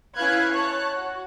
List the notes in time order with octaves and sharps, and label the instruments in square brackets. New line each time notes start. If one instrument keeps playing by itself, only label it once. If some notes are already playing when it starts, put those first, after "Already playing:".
[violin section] C#4 E4 B4 F5 F#6 G#6
C#5 A5 F#6
F#4